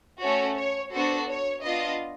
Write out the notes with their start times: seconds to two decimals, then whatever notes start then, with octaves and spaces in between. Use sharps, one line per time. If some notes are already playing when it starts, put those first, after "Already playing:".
0.21 A3 C#4 F#4 C#5
0.57 C#5
0.93 B3 D4 F#4 A4 C5
1.28 C#5
1.63 B3 D4 F4 D#5